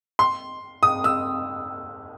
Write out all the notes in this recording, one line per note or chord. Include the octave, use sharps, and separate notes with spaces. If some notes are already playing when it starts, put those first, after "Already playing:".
C6
D#6
E6